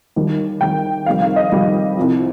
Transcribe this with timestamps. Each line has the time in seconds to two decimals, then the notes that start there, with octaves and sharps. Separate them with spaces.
0.16 D#2 D#3 G3
0.61 D#2 D#3 G3 G5
1.06 F2 C3 D#3 G3 F5
1.22 F5
1.36 D#5
1.52 F2 C3 D#3 G3
1.97 C2 C3 F3